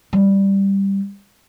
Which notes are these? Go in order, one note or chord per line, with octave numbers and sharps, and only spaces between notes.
G3